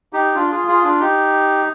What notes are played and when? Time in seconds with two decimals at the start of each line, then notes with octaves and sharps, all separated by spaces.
0.13 D#4 G4
0.35 D4 F4
0.51 F4 G#4
0.67 F4 G#4
0.84 D4 F4
1.00 D#4 G4